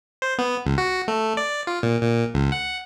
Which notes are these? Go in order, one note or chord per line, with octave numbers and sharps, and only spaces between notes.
C5
B3
C#2
F#4
A3
D5
F4
A#2
A#2
C#2
F#5